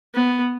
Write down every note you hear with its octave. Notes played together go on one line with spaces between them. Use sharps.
B3